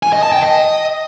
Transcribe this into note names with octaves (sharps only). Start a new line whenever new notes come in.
G#5
D#5
A5
G5
D#5